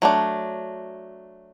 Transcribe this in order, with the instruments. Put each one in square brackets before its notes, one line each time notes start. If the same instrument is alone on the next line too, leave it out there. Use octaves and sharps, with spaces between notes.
[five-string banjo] F#3 A3 D4